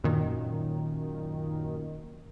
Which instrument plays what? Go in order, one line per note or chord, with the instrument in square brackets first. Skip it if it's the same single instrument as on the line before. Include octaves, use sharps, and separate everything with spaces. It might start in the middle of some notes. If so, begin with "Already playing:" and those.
[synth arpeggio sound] F#2 A#2 D#3